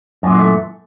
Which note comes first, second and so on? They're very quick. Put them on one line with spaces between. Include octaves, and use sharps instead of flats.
F#2 A#2 E3 G#3 A3